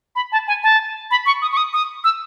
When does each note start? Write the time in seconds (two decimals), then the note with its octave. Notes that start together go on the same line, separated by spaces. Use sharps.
0.16 B5
0.32 A5
0.47 G#5
0.63 A5
1.11 B5
1.26 C#6
1.42 D#6
1.52 C#6
1.57 D#6
1.73 D#6
2.04 E6